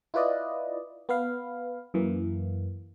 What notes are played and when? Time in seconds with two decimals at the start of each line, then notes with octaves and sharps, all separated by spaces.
0.14 E4 F4 B4 D5 D#5
1.09 B3 B4 F5
1.94 F#2 E3 A#3